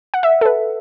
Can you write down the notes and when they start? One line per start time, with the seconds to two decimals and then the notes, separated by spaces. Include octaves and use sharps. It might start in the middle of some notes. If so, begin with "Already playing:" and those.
0.14 F#5
0.23 E5
0.41 A4
0.45 B4